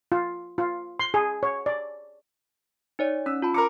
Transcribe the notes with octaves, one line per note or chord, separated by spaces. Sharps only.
F4
F4
C6
G#4
C#5
D5
D#4 C#5 D5
C#4 E6
F4 A5 B5
A#4 A#5 D6 C#7